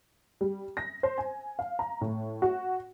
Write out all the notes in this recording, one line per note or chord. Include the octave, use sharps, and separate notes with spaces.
G3
A#6
C5
G#5
F5
A#5
A2
F#4